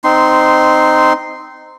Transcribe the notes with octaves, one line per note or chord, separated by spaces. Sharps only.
C4 D#4 C6